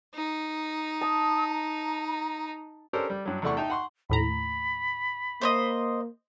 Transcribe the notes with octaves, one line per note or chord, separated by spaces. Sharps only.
D#4
A5 D#6
A#5
C#4 D4 G4 A4 A#4 C5
G3
G2 F#3
E2 C3 A3 D5 F#5 C#6
D#4 E5 G5 A5
F#5 C6 C#6
D#2 A2 A#5 B5
A#3 C5 C#5 D#5